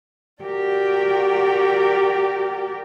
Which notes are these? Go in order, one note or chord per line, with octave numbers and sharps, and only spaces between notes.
F#4 G4 A#4 D5 G5